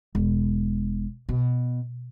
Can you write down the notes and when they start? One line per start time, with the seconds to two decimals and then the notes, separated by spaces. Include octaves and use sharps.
0.15 E1
1.29 B2